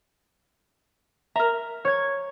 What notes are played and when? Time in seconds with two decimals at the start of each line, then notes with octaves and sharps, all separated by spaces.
1.36 A#4 E5 A#5
1.85 C#5 G#6